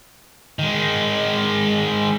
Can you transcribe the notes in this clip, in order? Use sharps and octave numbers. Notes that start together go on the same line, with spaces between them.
D#3 G#3